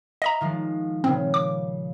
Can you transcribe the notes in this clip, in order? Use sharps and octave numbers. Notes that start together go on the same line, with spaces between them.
D#5 E5 A#5
D#3 F3 G#3
A#2 C#3 C4
D6